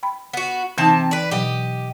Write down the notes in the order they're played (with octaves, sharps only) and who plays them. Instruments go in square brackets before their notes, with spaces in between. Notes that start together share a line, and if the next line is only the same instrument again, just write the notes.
[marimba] G5 B5
[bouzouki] B3 F#4
[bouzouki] C3 C4 A5 [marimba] E3 D#4
[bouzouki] B4 D5
[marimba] B2 F#3 [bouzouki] G4 D#5